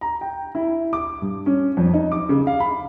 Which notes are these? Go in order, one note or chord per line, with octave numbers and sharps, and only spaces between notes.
A#5
G5
E4
D6
G2
C#4
F2
D#4
D6
C#3
F5
B5